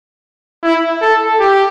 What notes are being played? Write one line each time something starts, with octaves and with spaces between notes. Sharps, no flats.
E4
A4
G4